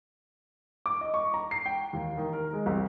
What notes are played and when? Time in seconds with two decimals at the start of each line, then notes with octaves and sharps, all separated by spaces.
0.86 D6
1.01 D#5
1.14 C#6
1.34 A#5
1.51 C7
1.66 G5
1.93 D#2
2.17 D#3
2.33 A#4
2.53 G#3
2.66 C2